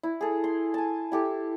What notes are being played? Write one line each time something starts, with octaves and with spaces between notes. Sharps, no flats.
E4
G#4 A4
C6
G#5 A5
E4 G4 A4